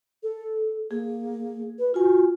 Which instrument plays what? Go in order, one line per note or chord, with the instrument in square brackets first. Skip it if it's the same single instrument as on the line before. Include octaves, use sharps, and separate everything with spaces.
[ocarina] A4
[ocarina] A#3 [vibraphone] G#4
[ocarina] B4
[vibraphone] F4 G#5 [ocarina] F#4